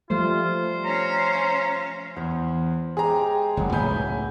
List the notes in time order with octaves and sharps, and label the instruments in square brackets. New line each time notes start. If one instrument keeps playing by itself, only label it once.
[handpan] F3 G3 A3 [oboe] F4 [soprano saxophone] C5
[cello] C#4 F5 [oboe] A#5
[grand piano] E2 [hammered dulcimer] C5
[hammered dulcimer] G#3 G4 G5 [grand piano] G#4 A#5
[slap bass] F#1 D#2 G#3 [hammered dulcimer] F#3 A#4 B4
[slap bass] C#2 A2 [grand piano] G#5 B5 G6